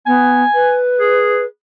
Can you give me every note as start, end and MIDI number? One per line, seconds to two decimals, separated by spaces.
0.06 0.43 59
0.06 0.75 80
0.54 1.45 71
1.00 1.44 68